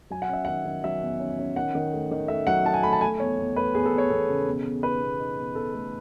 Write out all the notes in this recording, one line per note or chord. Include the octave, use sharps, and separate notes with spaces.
F#3 G#5
F#5
C#4 E5
D#3 F#5
D#3
F#3 E5
E2
C#4
C#4
D#3 F#5
D#3
A3
D#3
A3 E5
F#3 F#5
D#4 A5
G#5
A3 B5
A5
A3 G#5
E2 C#5
E2
A3 B4
E2 G#4
A4
E2
C#5
E2 A4
C#3
B2
B2
D#4 B4
B2
D#4
B2
B2 A4
A3